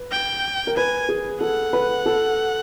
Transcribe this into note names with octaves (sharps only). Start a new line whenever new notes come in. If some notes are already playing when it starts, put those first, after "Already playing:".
Already playing: B4
G5
A#4
B4 G#5
G#4
A4 F#5
B4
A4